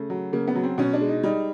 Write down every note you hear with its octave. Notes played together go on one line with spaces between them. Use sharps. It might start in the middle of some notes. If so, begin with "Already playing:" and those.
Already playing: C#3 A3
F#3
C#3 A#3
B3
F#3
C4
B2 C#4
D4
G#3
D#4
G3 D#4